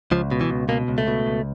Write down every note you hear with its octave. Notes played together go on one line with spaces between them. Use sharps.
C#2 F3
B2
E3
C#2
B2 A#3
C#2
A3
B2
C#2